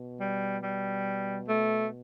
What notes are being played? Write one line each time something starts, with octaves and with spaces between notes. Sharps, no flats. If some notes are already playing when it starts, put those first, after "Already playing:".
Already playing: B2
G3
G3
A3